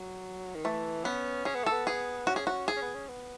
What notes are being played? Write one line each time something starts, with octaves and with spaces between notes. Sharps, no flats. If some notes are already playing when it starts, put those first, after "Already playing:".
Already playing: F#3
D#3
E3 A3
B3 C#4
C#4 G#4
B3
A3 A4
B3
G#4
C#4 F#4
G#4
F#4
G#4
C#4
B3
C#4
B3